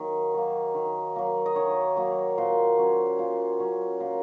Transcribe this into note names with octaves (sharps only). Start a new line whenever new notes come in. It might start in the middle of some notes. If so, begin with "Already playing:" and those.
Already playing: D#3 F#3 A#3
F#3 A#3
D#3
F#3 A#3
D#5
D#3 C#5
F#3 A#3
A#2 C5
F#3 C#4
A#2
F#3 C#4
A#2